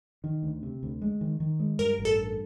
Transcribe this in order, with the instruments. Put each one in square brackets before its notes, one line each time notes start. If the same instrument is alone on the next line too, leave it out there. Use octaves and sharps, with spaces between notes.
[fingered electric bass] D#3
D2
C3
D2
G#3
D#3
D#3
G#3
[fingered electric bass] G2 [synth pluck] A#4
[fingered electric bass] A1
[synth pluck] A4
[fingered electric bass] G2